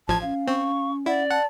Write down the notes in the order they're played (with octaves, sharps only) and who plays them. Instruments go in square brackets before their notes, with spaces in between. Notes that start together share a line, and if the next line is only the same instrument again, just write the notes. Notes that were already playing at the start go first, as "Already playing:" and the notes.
[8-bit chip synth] A1 F3 G#6 [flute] A5
[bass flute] C#4 [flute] F5
[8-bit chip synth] C4 [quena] C#6
[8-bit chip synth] E4 [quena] D5 [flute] F#5
[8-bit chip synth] F#5 [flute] A5